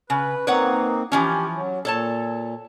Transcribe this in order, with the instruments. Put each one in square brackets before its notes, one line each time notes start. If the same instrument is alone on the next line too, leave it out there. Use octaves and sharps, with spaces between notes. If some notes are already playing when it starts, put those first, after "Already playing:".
[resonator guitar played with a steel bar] C#3 [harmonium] B4
[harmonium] A#3 C4 D#4 [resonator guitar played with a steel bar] B4 C#5 F#5
[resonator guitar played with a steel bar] E3 F3 C#4 [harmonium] G4
[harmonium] F#3
[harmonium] A#2 [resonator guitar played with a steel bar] A4 C#5 A5